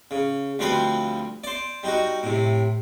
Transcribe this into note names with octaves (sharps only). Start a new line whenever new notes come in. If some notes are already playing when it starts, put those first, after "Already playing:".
C#3
D2 F3 G3 C4 B4 B5
C5 D5
G3 D#4 F#4
A2 C3